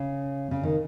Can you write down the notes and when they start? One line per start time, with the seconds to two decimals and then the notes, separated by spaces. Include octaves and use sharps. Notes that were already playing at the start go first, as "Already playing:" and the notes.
Already playing: C#3
0.51 C#3
0.63 D#3